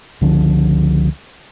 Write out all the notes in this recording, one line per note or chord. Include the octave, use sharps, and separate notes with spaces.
C#2 D3 F3